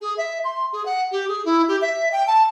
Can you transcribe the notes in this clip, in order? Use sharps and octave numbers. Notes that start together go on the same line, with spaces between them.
G#4
E5
C6
G#4
F#5
G4
G#4
E4
G4
E5
G5
A5